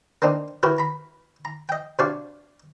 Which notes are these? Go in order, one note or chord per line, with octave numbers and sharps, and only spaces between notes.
A#3 C4 D4 D#4
E4 F#4 G4 A#4 B4 C#5
A#5 B5
A#5
D#5 G5
C3 D4 F#4 C#5 D5 F5